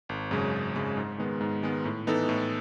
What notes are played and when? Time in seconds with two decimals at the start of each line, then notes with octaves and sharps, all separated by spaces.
0.09 G#1
0.31 F#2 C#3 G#3
0.53 G#1
0.76 F#2 C#3 G#3
0.97 G#2
1.18 D#3 G#3 B3
1.41 G#2
1.63 D#3 G#3 B3
1.85 A2
2.07 E3 B3 D#4 A4
2.29 A2